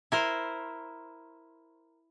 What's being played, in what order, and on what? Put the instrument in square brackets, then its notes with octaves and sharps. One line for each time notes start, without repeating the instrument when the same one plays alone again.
[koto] E4 A#4 C5